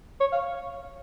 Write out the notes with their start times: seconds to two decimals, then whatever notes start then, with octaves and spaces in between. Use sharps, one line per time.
0.21 C#5
0.32 F5